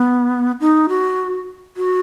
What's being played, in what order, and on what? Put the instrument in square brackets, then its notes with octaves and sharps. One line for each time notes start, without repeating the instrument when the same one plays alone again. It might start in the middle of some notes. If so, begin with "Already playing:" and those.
Already playing: [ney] B3
D#4
F#4
F#4